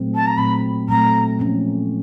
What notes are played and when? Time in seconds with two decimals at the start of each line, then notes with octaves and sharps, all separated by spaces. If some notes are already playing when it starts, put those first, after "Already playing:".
Already playing: A#2 F#3 A3 C4
0.15 A5
0.27 A#5
0.38 A#2 F#3 A3 C4 B5
0.89 A#2 F#3 A3 C4 A#5
1.39 F3 A#3 C#4